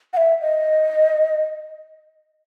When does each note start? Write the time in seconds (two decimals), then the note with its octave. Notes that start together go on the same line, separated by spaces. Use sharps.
0.13 F#5
0.17 E5
0.41 D#5